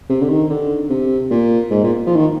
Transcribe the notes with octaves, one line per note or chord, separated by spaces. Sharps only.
C3
D3
D#3
D3
C3
A#2
G#2
A#2
F3
D#3